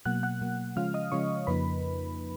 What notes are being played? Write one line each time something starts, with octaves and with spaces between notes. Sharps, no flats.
B2 F#3 A#3 F#5 F#6
F#5 F#6
B2 F#3 A#3
C#3 F3 G#3 C#4 F4 F5 F6
D#5 D#6
C#3 F3 G#3 C#4 F4 C#5 C#6
F2 C#3 F3 A#3 D#4 B4 B5